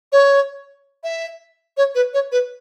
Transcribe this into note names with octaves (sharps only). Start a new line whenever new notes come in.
C#5
E5
C#5
B4
C#5
B4